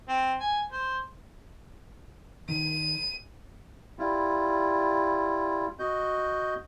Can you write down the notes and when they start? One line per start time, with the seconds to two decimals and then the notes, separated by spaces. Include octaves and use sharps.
0.08 C4
0.40 G#5
0.72 C5
2.49 D#3 D#7
3.98 G3 E4 F4
5.79 F#4 D#5 G6